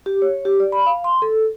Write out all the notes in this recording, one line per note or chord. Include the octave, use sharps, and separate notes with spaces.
G4
C#5
G4
D5
B5
F5
C6
A4